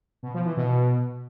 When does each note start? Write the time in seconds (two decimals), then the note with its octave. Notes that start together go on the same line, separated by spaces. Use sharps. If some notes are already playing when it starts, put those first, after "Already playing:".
0.23 B2
0.34 F3
0.45 E3
0.57 B2